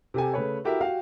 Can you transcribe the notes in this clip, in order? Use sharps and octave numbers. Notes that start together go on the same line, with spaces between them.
C3 G4 A4 G#5
C#3 A3 B4 C#5
E4 F#4 G4 A4 A#4 E5
F#4 G4 F5